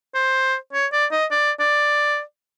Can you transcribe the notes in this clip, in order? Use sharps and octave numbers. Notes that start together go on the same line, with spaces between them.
C5
C#5
D5
D#5
D5
D5